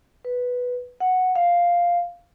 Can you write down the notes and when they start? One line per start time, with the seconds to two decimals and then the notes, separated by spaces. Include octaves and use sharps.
0.25 B4
1.00 F#5
1.35 F5